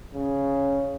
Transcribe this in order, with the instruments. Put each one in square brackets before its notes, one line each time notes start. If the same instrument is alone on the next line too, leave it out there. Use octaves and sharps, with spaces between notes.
[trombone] C#3